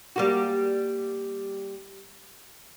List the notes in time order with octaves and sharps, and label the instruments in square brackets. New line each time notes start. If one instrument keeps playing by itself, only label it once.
[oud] G3 A#3 F#4